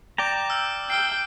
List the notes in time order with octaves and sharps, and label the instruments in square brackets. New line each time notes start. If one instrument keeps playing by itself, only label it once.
[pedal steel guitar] D5 G5 A#5 [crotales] D6 G6
[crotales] E6 F6
[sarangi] G5 [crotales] E6 F6 C7